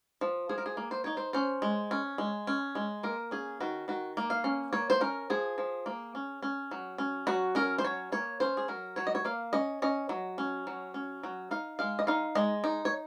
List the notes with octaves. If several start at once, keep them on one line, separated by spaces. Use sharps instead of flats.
F3
F3 G#4
A#4
G#4
A#3
C5
D#4 C#5
C5
C#4 C5
G#3
C#4
G#3
C#4
G#3
A#3 A#4
C#4 G#4
D#3 F#4
D#3 F#4
A#3
F5
C#4
A#3 C#5
C5
C#4 A#4
F3 G#4
F3
A#3
C#4
C#4
F#3
C#4
F#3 F#4
C#4 A#4
C5
F#3 C#5
A#3 C#5
C#4 C5
G#4
F#3 A#4
F#3 C#5
D#5
C#5
A#3 F5
C#4 D#5
C#4 D#5
F#3
C#4
F#3
C#4
F#3
D#4 F5
G#3 F5
D#5
D#4 F5
G#3 D#5
D#4
C#5